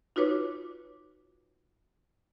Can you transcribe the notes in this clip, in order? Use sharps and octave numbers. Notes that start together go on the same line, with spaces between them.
D#4 F4 F#4 B4 C#5 D6